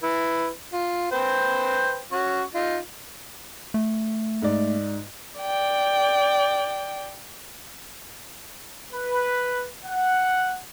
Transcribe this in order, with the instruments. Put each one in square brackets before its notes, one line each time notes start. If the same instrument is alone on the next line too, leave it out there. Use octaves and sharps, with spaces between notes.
[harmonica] E4 B4
F4
B4 C5 G5
C#4 F#4 C#6
D#4 F4
[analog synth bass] A3
[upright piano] G#2 D5
[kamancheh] D5 G5
[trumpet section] B4
F#5